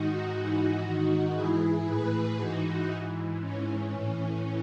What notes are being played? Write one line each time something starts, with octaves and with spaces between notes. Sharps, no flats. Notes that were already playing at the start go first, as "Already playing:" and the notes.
Already playing: G#2 D#3 D#4 F#4
G#2 E3 D#4 F#4
G#2 D#3
G#2 E3 E4 G#4
A2 E3 G#4 B4
G#2 E3 D#4 F#4
G#2 E3
G#2 E3 C#4
A2 E3 C#4